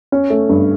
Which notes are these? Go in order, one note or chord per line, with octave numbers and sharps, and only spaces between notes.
C#4
A3
G2